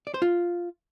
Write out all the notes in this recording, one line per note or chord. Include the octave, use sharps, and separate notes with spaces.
D5
C5
F4